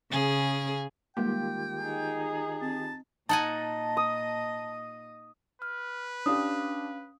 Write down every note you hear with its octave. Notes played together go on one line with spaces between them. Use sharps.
C#3 G#4
D#3 G3 G#3 A#3 F4 G4 G5
D#4 G#4
C4 A5
A#2 D#4 D#5 F#5 G#5 A5
D#6
B4 F6
C#4 D4 G4 F5 D#6